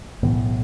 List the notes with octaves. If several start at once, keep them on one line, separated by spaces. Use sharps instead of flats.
B1 A2 E3 B3